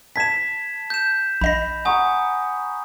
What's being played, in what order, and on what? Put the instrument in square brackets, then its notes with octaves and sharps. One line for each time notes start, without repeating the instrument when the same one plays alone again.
[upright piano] A5 G#6 [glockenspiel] B6 E7
[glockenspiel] G6 E7
[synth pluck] A#1 D#5 A#6 [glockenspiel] B5
[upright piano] F#5 A#5 C#6 [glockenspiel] G#5 D#6